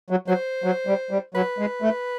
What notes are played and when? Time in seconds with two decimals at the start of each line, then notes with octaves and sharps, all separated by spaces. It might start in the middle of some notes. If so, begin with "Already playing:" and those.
0.10 F#3
0.28 F#3 C5
0.64 F#3
0.87 G3
1.11 G3
1.35 F#3 B4
1.58 G#3
1.82 A3